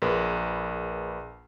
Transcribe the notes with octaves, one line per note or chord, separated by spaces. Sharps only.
A#1 G#4 A#4 B4 C6